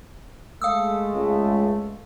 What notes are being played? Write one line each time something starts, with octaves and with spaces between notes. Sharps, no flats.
G#3 A3 F5 D#6 E6
C#2